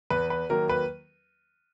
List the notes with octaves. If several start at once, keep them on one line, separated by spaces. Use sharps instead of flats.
E2 B4
B4
D#3 F#3 A#3 A#4
B4